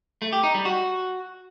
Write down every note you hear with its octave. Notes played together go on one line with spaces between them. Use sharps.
A3
G4
D#4
G3
F#4